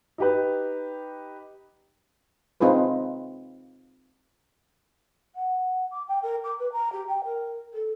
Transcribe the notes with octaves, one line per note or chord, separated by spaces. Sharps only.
D#4 G4 B4
C4 D#4 F4 G#4 B4
F#5
D6
G5
A#4
D6
B4
A#5
G4
G5
A#4
A4